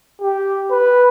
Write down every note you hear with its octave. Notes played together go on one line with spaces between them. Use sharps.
G4
B4